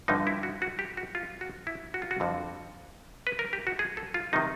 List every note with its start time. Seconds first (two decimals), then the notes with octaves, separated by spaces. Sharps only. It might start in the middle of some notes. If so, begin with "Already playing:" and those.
0.08 G2 D3 F3 D#4
0.27 E4
0.43 F#4
0.62 F#4
0.79 G4
0.97 F#4
1.15 F4
1.41 F#4
1.67 E4
1.94 F#4
2.02 F4
2.11 F#4
2.20 F2 D3 F3
3.27 B4
3.39 A#4
3.53 G4
3.67 F#4
3.79 G#4
3.97 A4
4.14 F4
4.33 C3 D#3 D#4